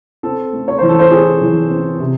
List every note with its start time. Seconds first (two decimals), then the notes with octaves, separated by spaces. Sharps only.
0.23 C4 A4
0.53 A3
0.68 C#5
0.78 E3 C5
0.89 A4
0.99 C5
1.11 C4 G#4
1.41 E3
1.70 C4
2.00 C3